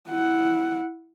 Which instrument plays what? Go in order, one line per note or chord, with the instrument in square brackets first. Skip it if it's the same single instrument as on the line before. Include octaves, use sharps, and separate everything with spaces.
[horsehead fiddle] E4 F#5